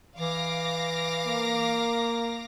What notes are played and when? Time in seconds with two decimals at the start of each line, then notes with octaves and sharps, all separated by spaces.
0.18 E3 F5 D6 A#6
1.27 A#3